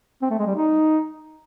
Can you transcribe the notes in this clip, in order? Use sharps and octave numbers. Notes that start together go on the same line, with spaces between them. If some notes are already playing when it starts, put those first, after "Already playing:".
C4
A3
G#3
G3
D#4